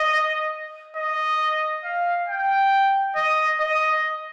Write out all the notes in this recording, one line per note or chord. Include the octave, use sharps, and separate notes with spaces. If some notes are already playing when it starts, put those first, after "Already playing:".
Already playing: D#5
D#5
F5
G5
D#5
D#5